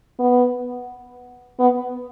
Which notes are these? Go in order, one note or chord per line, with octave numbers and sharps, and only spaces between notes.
B3
B3